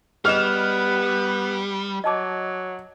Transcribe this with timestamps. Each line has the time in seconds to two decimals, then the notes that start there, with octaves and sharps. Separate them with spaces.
0.25 G3 B3 G#4 D#5 F6 E7
2.04 F#3 D#5 A5 D6